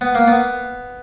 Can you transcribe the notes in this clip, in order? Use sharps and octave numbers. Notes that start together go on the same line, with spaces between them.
B3
A#3
B3